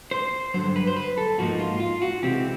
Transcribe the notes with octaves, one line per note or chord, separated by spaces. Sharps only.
C5
G2 D3 F#3 C5
B4
C5
B4
A4
G#2 F3 A#3 D#4 F#4
F4
F4
F#4
C3 E3 G#3 C4 G4